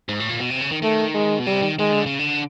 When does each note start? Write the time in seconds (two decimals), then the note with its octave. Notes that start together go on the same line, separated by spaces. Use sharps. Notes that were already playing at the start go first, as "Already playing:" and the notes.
0.09 G#2
0.20 A2
0.29 A#2
0.40 B2
0.50 C3
0.61 C#3
0.72 D#3
0.82 D#3 A3
1.14 G#3
1.39 B2
1.47 C3 G3
1.62 D#3
1.79 D#3 G#3
1.92 D3
2.06 C#3
2.19 D3